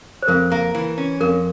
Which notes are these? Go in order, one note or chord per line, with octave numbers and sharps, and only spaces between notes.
C5
F2 A#4
A#3
E3
C#4
F2 A#4